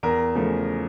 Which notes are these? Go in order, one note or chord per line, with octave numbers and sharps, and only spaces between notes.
E2 A#4
C#3 F3 A3